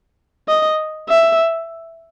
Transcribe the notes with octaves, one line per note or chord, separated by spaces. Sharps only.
D#5
E5